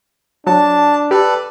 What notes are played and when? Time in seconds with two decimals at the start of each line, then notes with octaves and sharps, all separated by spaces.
0.47 F#3 D4 A5
1.11 G4 A4 B4 D5